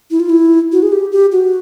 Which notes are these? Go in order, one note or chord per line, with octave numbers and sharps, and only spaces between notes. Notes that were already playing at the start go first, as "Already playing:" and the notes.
E4
F4
E4
F#4
G#4
G4
G4
F#4